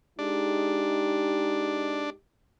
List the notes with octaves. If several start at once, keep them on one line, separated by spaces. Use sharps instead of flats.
G#3 D4 D#4 G4